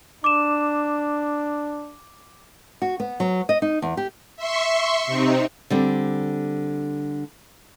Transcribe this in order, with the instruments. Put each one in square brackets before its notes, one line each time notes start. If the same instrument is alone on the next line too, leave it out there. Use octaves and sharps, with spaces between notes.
[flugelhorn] D4 [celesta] D6 E7
[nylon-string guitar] F#4
B3
F#3
D#5
D#4
E2
G4
[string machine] E5 C6 C#6
C3 C4 D#4
[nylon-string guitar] D3 G3 C4